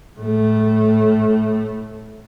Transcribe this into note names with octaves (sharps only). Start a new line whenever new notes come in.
A2 A3